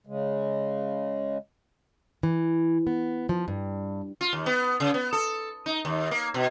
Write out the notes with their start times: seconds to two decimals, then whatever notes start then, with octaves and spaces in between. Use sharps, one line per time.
0.06 C#3 G#3
2.23 E3
2.87 B3
3.29 F3
3.48 G2
4.21 F4
4.33 D#2
4.46 B3
4.80 C#3
4.94 B3
5.13 A4
5.66 D#4
5.85 D#2
6.11 A#3
6.34 B2